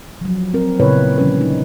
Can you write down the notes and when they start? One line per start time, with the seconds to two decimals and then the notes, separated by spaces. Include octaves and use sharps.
0.21 F3 F#3
0.54 C4 A#4
0.80 A#2 C#3 B3 E4 B4 C#5
1.18 D3 F3 G3 C#4 B4
1.41 D#4